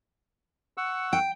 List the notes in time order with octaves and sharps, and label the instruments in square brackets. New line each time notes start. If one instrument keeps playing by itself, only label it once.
[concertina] F#5 C#6 E6
[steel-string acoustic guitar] G5